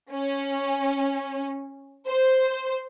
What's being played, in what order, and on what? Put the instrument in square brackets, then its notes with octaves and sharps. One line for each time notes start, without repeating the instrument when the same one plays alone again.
[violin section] C#4
C5